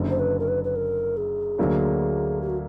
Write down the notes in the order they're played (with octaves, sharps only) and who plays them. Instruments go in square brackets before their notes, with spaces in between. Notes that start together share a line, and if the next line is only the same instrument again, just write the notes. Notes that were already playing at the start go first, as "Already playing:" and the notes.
Already playing: [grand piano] F#1 F#2 D3 F#3
[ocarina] C5
B4
A#4
B4
B4
A#4
G#4
[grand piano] D2 D3 F#3 A#3 D4
[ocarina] G4
F#4